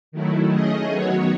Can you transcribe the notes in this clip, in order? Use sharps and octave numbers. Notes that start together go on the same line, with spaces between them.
D#3 F#3 A3 E4
A3 C#4 G#4 D#5
D#3 F#3 B3 F#4 C#5